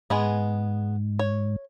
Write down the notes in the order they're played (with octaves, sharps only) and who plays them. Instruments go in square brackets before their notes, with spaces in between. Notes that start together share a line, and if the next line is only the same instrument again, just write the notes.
[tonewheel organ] G#2 [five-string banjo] G#3 B3 G#4
[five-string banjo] C#5